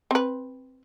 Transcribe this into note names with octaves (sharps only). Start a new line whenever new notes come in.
C4 B4